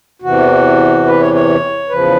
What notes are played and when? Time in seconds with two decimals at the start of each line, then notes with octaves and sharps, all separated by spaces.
0.22 E2 C3 E3 F#4
1.06 B4
1.20 C#5
1.34 C#5
1.89 E2 C#3 F3 B4